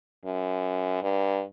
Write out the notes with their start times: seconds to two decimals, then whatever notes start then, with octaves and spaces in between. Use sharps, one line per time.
0.25 F#2
1.02 G2